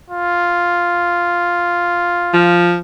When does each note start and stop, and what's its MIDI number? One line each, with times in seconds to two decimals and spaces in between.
0.10 2.66 65
2.33 2.79 53